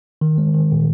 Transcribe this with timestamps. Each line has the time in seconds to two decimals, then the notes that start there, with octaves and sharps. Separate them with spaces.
0.21 D#3
0.38 G#3
0.54 D#3
0.71 A#2